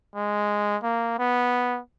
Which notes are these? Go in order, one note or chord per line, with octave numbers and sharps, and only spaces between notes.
G#3
A#3
B3